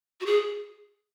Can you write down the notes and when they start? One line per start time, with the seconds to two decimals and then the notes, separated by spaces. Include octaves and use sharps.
0.21 F#4
0.26 G#4